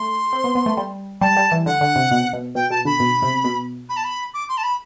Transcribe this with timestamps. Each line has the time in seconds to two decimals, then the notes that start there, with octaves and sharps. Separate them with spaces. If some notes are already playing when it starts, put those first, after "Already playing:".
Already playing: A3 C6
0.33 C4
0.44 B3
0.55 B3
0.66 A3
0.77 G3
1.21 G3 A5
1.37 G3
1.52 E3
1.66 D3 F#5
1.81 D3
1.96 C3
2.11 B2
2.33 B2
2.55 B2 G5
2.70 B2 A5
2.85 D3 B5
3.00 B2
3.22 C3
3.44 B2
3.89 B5
3.97 A5
4.04 B5
4.34 D6
4.49 C6
4.57 A5
4.63 B5